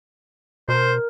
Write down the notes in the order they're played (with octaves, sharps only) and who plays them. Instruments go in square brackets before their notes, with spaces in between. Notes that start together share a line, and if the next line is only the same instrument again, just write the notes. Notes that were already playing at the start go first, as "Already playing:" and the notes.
[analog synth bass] B2 [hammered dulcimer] A#4 [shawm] C5